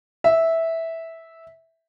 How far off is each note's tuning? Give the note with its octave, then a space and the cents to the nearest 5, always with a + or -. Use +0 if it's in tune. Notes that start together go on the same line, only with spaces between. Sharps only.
E5 -10